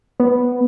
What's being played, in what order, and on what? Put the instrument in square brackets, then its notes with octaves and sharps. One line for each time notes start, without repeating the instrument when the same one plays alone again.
[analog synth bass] B3